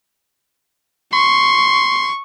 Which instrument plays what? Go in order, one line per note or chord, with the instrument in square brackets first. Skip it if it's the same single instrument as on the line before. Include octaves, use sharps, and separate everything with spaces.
[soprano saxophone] C6 [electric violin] C#6